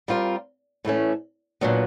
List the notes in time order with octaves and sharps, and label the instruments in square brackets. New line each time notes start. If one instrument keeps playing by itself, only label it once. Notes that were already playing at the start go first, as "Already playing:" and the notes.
[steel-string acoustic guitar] G3 C4 F4 A#4
A2 E3 A3 C#4
A#2 F#3 B3 D4